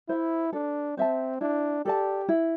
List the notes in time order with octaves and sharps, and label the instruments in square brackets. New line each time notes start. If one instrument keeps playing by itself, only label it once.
[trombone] E4 [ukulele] C5 E5
[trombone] D4 [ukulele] A4
[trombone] C4 [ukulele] C5 E5 A5
[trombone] D4 [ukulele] E4
[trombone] G4 [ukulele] A4 D5 A5
[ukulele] E4